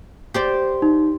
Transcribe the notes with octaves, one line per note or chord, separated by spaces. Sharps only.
G4 C5 D5
D#4